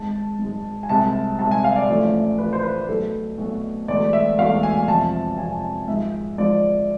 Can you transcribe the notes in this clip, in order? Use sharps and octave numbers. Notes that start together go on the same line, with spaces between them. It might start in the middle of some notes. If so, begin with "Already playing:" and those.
Already playing: G#1 G#2 G#3 A5
G#1 G#2 G#3
G#5
C2 C3 G#3 A5
C2 C3 G#3 A5
G#5
F5
D5
A1 A2 F3 A3
A1 A2 F3 A3 B4
C5
B4
B1 B2 A3 A4
B1 B2 A3
E1 E2 B2 A3 D5
E5
E1 E2 B2 A3 F5
G#5
F2 C3 F3 A5
F2 C3 F3 G#5
G#1 G#2 F3 G#3 E5
G#1 G#2 F3 G#3 D5